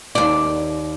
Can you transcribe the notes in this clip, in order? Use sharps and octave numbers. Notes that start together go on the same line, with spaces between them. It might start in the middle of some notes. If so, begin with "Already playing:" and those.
D#2 D5